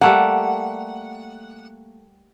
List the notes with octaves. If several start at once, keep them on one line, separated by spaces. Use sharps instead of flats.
G3 A3 A#3 F#5